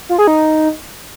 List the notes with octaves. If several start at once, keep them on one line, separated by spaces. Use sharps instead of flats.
F4
G#4
D#4